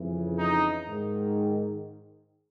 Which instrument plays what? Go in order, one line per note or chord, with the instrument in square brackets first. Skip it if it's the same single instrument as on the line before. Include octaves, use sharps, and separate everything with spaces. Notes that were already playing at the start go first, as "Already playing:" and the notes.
Already playing: [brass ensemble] F2 C#3 E3
D#4
G#2 D#3